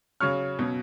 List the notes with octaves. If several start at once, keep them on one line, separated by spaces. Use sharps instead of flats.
C#3 F#3 C#4 C#6 F6
B2 F#3 C#4